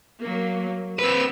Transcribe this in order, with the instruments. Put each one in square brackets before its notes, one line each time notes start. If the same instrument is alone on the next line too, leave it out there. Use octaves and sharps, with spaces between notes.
[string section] F#3 A#3
[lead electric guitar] C4 B4 [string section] E6